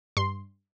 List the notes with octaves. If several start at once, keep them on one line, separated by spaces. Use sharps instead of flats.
G2 C6